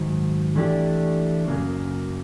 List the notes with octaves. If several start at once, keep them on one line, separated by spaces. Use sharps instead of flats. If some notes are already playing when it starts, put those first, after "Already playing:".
Already playing: G#2 D#3 F#3
E3 A3 D4 G4
F#2 C#3 F#3 A#3